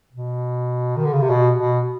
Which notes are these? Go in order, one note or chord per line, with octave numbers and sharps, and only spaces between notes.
B2
D#3
D3
C#3
C3
B2
B2